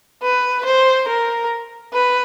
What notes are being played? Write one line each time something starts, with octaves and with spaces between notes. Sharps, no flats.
B4
C5
A#4
B4